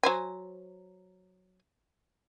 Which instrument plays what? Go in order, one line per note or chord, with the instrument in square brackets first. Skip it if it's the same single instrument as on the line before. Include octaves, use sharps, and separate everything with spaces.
[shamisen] F#3 C5 G#5